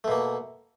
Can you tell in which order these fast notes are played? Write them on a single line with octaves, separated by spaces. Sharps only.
A3 B2 A#3